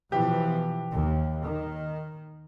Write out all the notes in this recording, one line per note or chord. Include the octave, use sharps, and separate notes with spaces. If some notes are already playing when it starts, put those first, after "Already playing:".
B2 E3 F3 G4
D#2
D#3